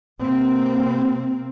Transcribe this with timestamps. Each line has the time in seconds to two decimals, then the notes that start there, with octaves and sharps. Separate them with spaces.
0.22 C3 A#3 C4